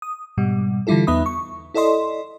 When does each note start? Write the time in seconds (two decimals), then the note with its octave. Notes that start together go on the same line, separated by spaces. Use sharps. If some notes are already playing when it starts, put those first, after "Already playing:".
0.02 D#6
0.38 G#2 B2 G3
0.87 D3 E3 G3 E4 F4 A4
1.07 E2 B3 D#4 E5 B5 D#6
1.26 C#6
1.74 E4 A4 D5 D#5 C6